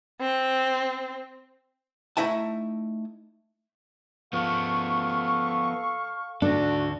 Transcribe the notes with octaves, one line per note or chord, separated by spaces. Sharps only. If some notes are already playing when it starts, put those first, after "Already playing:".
C4
A3 D#4 E4 E5 F#5 A5
F3 B3 A4 F5 C#6
D2 G#2 D4 F#4 A4